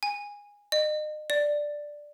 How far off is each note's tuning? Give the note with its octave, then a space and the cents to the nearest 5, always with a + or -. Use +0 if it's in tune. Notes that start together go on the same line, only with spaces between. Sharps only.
G#5 -20
D#5 -35
D5 +5